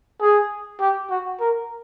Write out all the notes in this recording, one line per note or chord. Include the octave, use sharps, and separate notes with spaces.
G#4
G4
F#4
A#4